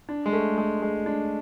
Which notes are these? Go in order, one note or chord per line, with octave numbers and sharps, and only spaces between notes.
D4
G#3
A3
G#3
G#3
D4